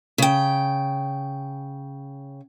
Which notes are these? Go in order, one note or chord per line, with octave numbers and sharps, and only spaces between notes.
C#3 G5